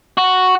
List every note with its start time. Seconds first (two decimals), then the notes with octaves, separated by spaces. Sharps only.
0.18 F#4